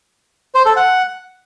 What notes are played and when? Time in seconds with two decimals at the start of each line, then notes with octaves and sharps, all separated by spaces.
0.55 C5
0.66 A4
0.76 F#5